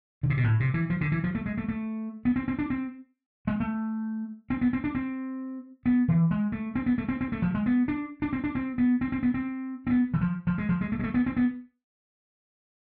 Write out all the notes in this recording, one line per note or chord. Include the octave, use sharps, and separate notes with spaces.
D3
C3
B2
A2
C3
E3
F3
D3
E3
F3
A3
G#3
A3
A3
B3
C4
C4
D4
C4
G#3
A3
C4
B3
C4
D4
C4
B3
E3
G#3
A3
C4
B3
A3
C4
C4
A3
F3
G#3
B3
D4
D4
C4
D4
C4
B3
C4
C4
B3
C4
C4
B3
E3
F3
F3
G#3
F3
G#3
A3
G#3
A3
B3
C4
B3